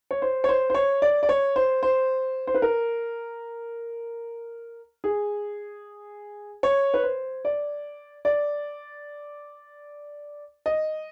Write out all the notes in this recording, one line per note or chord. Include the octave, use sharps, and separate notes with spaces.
C#5
C5
C#5
C5
C5
C#5
D5
D5
C#5
C5
C5
C5
B4
A#4
G#4
C#5
B4
C5
D5
D5
D#5